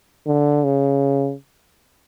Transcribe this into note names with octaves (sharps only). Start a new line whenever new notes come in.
D3
C#3